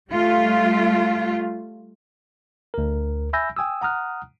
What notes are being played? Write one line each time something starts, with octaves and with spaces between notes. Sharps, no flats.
G3 A3 F4
D2 A#4
E5 G#5 B5 E6 G6 A#6
G5 G#5 D#6 E6
F#5 A#5 D#6 F6 F#6